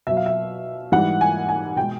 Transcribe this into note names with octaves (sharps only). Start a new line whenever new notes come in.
B2 F#3 E5
F5
E5
G#2 E3 G3 F#5
G#5
G#5
B2 G#3 G5